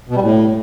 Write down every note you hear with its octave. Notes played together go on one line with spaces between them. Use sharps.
B2
G3
A2